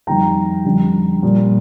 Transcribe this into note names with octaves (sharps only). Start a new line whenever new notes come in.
F2 D#3 G3 G5 A#5
F2 D3 G3
A#2 G3